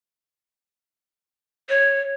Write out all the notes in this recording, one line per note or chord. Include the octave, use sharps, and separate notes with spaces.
C#5